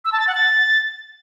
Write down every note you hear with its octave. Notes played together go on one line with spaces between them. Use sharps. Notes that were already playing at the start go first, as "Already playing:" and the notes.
E6
A5
A6
F#5
A6